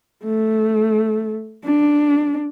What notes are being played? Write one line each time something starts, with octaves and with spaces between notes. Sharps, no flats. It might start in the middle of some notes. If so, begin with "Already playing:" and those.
A3
D4